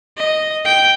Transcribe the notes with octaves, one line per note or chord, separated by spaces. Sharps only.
D#5
G5